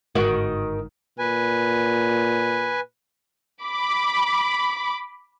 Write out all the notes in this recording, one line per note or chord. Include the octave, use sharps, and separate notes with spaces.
G1 G#2 D#3 F#4
A#2 B4 G#5
B5 D6